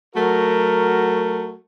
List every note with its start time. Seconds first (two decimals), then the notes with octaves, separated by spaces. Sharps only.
0.15 F#3 A3 F#4 A#4